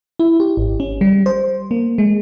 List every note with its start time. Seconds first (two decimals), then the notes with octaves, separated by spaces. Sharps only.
0.19 E4
0.40 G4
0.57 G#1
0.80 C#4
1.01 G3
1.26 C5
1.71 A#3
1.98 G#3